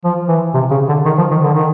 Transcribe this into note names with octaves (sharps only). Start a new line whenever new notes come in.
F3
E3
C3
C#3
D3
D#3
F3
D#3
D3
D#3